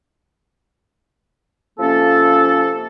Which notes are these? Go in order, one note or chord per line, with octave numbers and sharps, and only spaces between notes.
C3 F3 A#3 C#4 A4